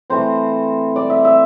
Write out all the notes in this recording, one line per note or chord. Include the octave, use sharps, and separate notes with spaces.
E3 A3 C4 C5
D5
E5
E5